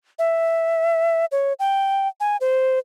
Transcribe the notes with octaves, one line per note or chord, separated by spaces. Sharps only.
E5
C#5
G5
G#5
C5